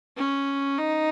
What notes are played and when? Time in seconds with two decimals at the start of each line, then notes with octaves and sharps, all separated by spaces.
0.17 C#4
0.78 D#4